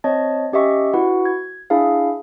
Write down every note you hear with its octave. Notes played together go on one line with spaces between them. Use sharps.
C4 C#5 D#5 A5
C#4 G4 D#5 E5 C#6
E4 F#4 B4 F#5
G#6
D4 E4 G#4 E5 F5